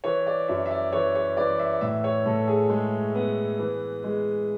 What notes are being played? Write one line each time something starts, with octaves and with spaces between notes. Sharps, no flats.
E3 C#5
D5
F#2 E5
E5
D5
E3 C#5
C#5
E3 D5
E5
A2 E5
C#5
A2 A4
G#4
G#3
B3
E3
G#3